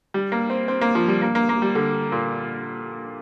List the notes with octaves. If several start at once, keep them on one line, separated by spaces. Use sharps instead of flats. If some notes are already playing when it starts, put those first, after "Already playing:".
G3
A#3
C4
C4
A#3
F3
G3
A#3
A#3
A#3
G3
D3
A#2